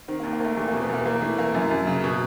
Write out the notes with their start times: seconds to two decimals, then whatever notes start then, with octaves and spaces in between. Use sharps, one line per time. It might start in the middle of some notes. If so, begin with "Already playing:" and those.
0.08 D#3 C4
0.20 D#2 A#3
0.33 A#3
0.40 D#2 A3
0.57 E2 A3
0.68 A#3
0.74 B2
0.82 B3
0.89 E2 A#3
1.06 E2 A#3
1.22 E3 A3
1.38 E2 A#3
1.55 F#2
1.71 F#2
1.87 C#3
2.04 B2